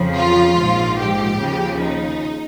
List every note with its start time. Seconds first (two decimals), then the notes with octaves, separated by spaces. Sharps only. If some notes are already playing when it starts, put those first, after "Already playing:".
Already playing: F2 C#3 F3
0.16 F4
0.57 A#1 G#2 F3
0.98 G4
1.38 D#2 C#3 F3
1.79 D#4